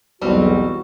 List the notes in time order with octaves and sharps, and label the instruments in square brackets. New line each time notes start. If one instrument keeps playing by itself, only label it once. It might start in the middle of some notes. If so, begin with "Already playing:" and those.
[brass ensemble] B1 E2 [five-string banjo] G3 C4 [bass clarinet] F#4